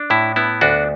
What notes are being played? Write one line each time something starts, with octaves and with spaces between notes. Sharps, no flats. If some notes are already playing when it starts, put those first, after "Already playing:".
Already playing: D4
A2 E4
B3 E4
D2 D4 F#4